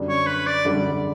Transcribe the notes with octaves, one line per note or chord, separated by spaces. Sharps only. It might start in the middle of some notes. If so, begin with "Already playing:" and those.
Already playing: F#2 D3 G3 D4
C#5
B4
D5
F#2 D3 G3 D4